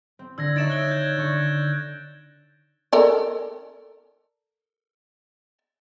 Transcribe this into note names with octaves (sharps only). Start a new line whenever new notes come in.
C4
D3 E6 G#6 A#6
D#4 C#5 E5 A6 D7 E7
F#6 G7
G6 G#6
D3 C#6
A4 A#4 D5